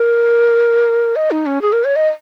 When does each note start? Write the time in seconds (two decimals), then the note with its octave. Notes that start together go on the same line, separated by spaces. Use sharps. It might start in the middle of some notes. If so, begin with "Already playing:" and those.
Already playing: A#4
1.16 D#5
1.31 D#4
1.46 C#4
1.62 G#4
1.72 A#4
1.84 C#5
1.96 D#5